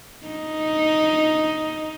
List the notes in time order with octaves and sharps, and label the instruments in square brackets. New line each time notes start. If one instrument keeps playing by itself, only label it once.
[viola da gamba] D#4